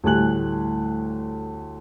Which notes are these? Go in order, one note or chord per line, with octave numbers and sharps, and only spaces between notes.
D2 A2 G3 G#5 F#6 F#7